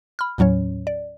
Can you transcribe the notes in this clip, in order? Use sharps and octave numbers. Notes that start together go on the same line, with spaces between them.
B5 F6
D#2 A2 F#3 C#4 C#5
D5